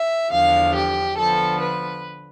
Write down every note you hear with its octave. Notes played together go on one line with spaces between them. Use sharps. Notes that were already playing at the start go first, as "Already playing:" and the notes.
Already playing: E5
E2 D3 F3 F5
G4
D3 F3 B3 A4
B4